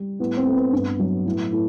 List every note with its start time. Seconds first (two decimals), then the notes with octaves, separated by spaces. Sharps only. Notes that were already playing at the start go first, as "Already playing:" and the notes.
Already playing: G3
0.19 A2 B3
0.37 C4
0.46 A3
0.55 B3
0.73 G2
0.99 F#3
1.26 A2
1.52 A2